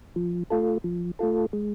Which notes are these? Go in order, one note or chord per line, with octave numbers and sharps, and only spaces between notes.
F3
A3 F4 A4
F3
A3 F4 A4
G#3